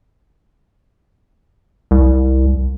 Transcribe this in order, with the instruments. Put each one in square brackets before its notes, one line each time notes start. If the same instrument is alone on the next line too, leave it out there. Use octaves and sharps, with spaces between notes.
[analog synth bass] C2